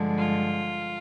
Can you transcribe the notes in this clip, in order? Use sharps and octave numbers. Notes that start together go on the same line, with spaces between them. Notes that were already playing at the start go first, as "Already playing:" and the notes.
Already playing: G2 D3 F3 G#3
F4